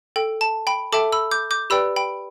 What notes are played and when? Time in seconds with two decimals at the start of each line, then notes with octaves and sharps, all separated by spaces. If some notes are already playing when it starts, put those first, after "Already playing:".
0.16 A4 G5
0.41 A5
0.67 G5 B5
0.92 A4 E5 G5 A5 D6
1.12 B5 E6
1.31 D6 G6
1.51 D6 G6
1.70 G4 B4 D5 G5 B5 E6
1.96 G5 B5